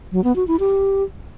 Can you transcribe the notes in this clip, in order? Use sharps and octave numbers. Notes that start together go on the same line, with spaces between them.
F#3
B3
F#4
E4
G4